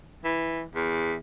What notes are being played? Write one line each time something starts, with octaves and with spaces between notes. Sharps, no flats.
E3
E2